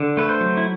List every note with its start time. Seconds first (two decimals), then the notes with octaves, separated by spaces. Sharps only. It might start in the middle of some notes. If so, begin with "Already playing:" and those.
Already playing: D3
0.17 A3 B4
0.29 C5
0.41 F#3
0.57 E4